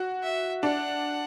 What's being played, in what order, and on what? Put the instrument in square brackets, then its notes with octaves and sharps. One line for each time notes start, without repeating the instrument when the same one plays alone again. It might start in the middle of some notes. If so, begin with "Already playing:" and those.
Already playing: [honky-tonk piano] F#4
[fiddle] E5
[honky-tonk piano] D4 [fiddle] F#5